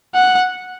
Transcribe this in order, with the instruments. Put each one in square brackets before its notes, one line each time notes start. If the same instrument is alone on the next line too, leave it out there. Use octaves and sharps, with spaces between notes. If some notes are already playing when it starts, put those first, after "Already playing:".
[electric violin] F#5